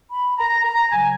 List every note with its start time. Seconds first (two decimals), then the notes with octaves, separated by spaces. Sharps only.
0.12 B5
0.38 A#5
0.65 A#5
0.91 C#3 F#3 G#5